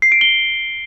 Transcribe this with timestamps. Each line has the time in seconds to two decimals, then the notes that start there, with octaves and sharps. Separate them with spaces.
0.02 C7
0.12 D7
0.21 G7